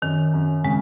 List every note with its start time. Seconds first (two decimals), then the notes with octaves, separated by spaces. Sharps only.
0.02 F#2 D#3
0.34 F#2
0.64 C#3 G#3